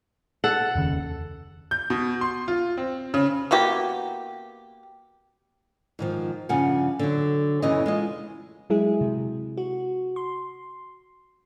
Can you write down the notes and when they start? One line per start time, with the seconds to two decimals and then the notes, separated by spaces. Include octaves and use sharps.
0.44 A4 F#5
0.75 F1 D#2 C#3
1.71 G6
1.90 B2
2.21 C6
2.48 F4
2.77 C4
3.14 C#3
3.51 A#3 B3 F#4 G4
5.99 G#2 D#3 F3
6.49 G2 C#3 F3 F#5 G#5
6.99 D3 F#3
7.62 F#2 C#3 E3 B3 C#4 D#5
7.86 G#3 F4 D#5
8.70 F#3 G#3 E4 G#4
9.01 C3
9.57 F#4
10.16 C6